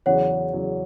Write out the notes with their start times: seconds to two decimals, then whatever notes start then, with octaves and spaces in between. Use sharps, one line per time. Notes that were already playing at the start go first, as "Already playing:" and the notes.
0.06 E2 C#3 F#3 C#5 F#5
0.53 E2 C#3 F#3